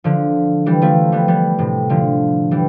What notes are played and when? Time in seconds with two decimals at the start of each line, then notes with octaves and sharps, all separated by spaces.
0.04 D3 F3
0.66 E3 G3
0.82 F3 A3
1.12 G3 B3
1.28 G3 B3
1.58 A2 C3
1.89 D3 F3
2.51 E3 G3